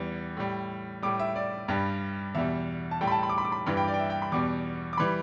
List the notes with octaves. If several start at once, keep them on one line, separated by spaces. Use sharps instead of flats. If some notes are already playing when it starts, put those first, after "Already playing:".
Already playing: E2 E3 G3
A2 G3
A2 G3 D6
E5
D5
G2 G3
E2 B2 G3 E5
A5
A2 G3 G5
B5
A5
B5
D6
B5
D6
B5
G2 E3 G3 B5
G5
D5
G5
E5
G5
B5
E2 B2 G3 D6
D6
E3 G3 B5